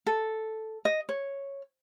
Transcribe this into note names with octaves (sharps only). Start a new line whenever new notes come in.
A4
D#5
C#5